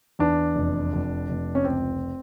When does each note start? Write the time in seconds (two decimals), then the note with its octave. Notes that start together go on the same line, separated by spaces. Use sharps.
0.19 E2 D4
0.55 F1
0.93 F1
1.29 F1
1.55 C#4
1.64 C#2 C4